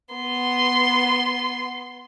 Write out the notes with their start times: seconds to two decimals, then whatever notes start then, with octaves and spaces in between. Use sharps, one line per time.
0.15 B3 C6